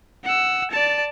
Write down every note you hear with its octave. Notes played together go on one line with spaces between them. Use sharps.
F#5 E6
D5 A5